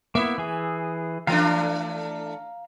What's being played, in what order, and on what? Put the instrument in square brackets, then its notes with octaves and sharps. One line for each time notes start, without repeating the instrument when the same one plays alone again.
[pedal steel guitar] A#3 B3 E4 [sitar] E5
[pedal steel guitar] E3 G#4
[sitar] E3 A3 D4 [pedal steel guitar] F5 A#5 F6